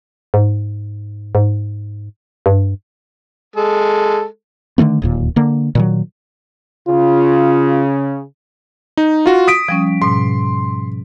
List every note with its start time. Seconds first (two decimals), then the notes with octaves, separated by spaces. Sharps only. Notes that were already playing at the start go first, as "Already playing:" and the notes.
0.34 G#2
1.35 G#2
2.46 G2
3.56 G#3 A4
4.78 D3 D#3 A3 B3
5.02 D1 D#2 A#2
5.36 D3 A#3
5.75 A#2 D#3 F#3
6.88 C#3 F4
8.97 D#4
9.26 F4 F#4
9.48 D#6 B6 D7
9.68 F3 G3 C#4
10.02 G#2 B2 C6